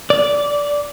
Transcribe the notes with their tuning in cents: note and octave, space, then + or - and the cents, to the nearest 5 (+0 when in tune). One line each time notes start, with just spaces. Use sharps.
D5 -15